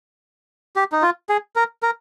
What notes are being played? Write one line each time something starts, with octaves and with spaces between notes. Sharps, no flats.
G4
D#4
F4
G#4
A#4
A#4